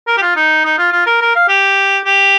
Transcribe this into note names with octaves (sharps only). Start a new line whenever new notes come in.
A#4
G4
F4
D#4
D#4
F4
F4
A#4
A#4
F5
G4
G4